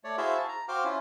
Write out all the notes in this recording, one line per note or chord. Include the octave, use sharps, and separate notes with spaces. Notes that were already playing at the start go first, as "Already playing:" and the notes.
A3 C#5 D5
E4 F#4 G#4 C5 E5 F5
A5
A#5
F#4 C5 F5 G5 D6 F6
C#4 E4 F4